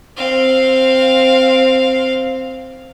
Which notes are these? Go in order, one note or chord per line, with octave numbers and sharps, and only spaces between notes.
C4 F5